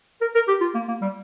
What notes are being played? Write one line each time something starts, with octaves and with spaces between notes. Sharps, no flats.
A#4
A#4
G4
F4
A#3
A#3
G3